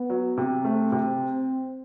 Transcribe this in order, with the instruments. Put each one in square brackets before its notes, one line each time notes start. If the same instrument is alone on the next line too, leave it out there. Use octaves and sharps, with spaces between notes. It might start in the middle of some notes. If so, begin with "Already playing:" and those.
Already playing: [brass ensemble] B3
[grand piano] F#3
C3
[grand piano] A3 [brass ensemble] C4
[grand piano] C3